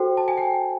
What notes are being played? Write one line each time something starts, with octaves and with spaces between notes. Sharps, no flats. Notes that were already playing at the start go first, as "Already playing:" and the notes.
Already playing: F#4 A4 C5 G5
A5
G#5
G5